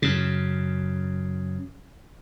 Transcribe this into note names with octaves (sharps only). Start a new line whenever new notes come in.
F#2 C#3